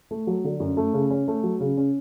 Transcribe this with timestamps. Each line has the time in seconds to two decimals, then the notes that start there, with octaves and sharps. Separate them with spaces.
0.11 A3
0.27 F#3
0.44 D3
0.60 F#2
0.77 A3
0.93 C#3
1.10 C#4
1.28 A3
1.43 F#3
1.60 C#3
1.77 C#4